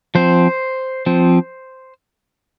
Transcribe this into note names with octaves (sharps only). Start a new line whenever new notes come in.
F3 C4 C5
F3 C4